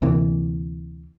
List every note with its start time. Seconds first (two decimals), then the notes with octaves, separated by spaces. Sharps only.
0.02 D2 C3 E3 A#3